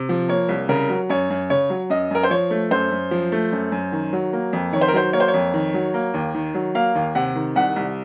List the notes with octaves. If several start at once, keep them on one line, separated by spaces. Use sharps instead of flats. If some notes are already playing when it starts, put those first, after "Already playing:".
Already playing: C3
F3
A#3 C#5
C2
C#3 A#4
F#3
F#2 C#5
F#2
C#3 C#5
F#3
F#2 D#5
F#2 A#4
C5
F3 C#5
A3
F#2 C5
F#2
F3
A3
F#2
F#2
D#3
F#3
A#3
F2
D#3 C#5
C5
A#4
F#3 C5
A#3 C#5
C5
C#5
F2
D#3
F#3
A#3
D#2
D#3
F#3
A#3 F5
D#2
C3 F#5
D#3
C2 F#5
C2